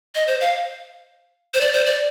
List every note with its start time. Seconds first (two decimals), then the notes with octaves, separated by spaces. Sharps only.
0.15 D#5
0.27 C5
0.41 F5
1.54 C5
1.61 D5
1.73 C5
1.86 D5